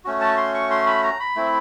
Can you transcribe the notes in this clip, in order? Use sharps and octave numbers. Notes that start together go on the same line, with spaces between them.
A3 C#4 F#4
A5
C6
C#6
C6
B5
A#5
B5
A3 C4 E4